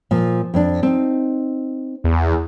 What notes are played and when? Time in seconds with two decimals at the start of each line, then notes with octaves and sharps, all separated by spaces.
0.11 A#2 F3
0.54 F2 D4
0.83 C4 D#4
2.04 E2